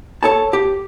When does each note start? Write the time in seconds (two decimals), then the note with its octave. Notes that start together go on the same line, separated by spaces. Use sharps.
0.23 A4 C#5 A5
0.53 G4